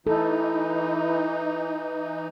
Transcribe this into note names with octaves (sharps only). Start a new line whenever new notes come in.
E3 D#4 E4 A4